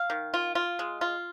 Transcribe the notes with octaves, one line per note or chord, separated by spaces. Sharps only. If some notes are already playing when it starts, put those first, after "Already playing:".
Already playing: F5
D#3
F4
F4
G#3
F4